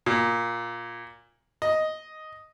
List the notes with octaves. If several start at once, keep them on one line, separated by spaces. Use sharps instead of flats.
A#2
D#5